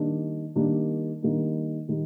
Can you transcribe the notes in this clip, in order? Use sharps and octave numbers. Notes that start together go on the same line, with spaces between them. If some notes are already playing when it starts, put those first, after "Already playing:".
Already playing: D#3 G3 A#3 D4
D#3 G3 A#3 D4
D#3 G3 A#3 D4
D#3 G3